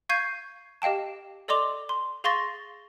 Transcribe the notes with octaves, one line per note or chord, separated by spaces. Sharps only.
F5 C#6 G6 G#6 C7 D#7
G4 D#5 F5 G5 A5
A4 D5 D#5 C6 D6 F7
C6
G#4 F5 C6 C#6 A6 A#6